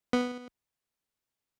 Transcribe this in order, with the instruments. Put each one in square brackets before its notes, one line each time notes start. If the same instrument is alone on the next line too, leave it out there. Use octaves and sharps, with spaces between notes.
[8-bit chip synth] B3